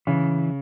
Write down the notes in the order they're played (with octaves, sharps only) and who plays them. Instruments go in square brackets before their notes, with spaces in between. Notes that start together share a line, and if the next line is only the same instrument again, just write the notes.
[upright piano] C#3 [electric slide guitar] E3